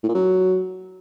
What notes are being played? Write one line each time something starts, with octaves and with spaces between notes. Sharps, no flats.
A2
A#2
F#3